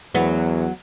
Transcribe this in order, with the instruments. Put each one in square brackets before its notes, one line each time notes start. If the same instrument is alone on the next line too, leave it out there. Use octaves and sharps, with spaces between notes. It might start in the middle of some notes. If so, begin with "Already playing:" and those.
[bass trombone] E2 [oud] F#3 B3